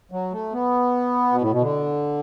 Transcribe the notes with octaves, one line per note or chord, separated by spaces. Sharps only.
F#3
A3
B3
B2
A2
B2
D3